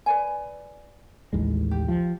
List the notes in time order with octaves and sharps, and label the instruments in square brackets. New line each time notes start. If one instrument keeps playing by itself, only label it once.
[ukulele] B4 D5 G#5
[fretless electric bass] A1 D#2 G#3
[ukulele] G4
[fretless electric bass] F3